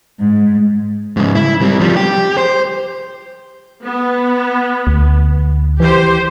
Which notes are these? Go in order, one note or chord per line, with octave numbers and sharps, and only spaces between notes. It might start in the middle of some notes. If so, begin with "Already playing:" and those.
G#2
G#2 C#3
E4
G3 C4
F3 G3
G4
C5
B3
D2
E3 G4 C5